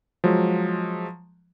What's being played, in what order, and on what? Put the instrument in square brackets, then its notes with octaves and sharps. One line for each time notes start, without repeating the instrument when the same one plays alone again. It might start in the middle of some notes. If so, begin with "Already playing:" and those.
[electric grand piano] F3 F#3 G#3